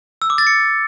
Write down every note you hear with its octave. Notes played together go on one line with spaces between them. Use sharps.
E6
D6
A6
C#7